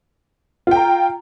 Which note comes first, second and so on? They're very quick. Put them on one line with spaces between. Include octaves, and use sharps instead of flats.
F4 G5 A#5